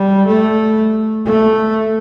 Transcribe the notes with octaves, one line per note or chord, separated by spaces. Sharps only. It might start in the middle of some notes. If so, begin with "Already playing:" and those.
Already playing: G3
A3
A3